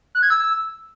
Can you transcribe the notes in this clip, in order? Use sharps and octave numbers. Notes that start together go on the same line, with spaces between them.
F#6
G#6
E6